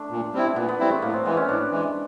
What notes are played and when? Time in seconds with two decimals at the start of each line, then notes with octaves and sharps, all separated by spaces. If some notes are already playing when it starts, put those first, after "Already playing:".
Already playing: A3 D4
0.11 A#2
0.33 G3 C4 E4
0.56 A#2 B3
0.68 B3
0.80 G3 C4 E4
0.91 A3
1.02 A2 A#3
1.13 C4
1.25 E3 G#3 B3
1.37 C#4
1.49 A2 D4
1.71 E3 G#3